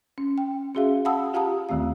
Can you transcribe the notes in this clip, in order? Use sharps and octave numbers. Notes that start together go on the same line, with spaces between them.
C#4
G5
C#4 F#4 G#4 E5 F5
F5 F#5 A5 B5 D#6 E6
F4 G4 F5 A5 A#5 D#6
D#2 D#3 A3 C4 F5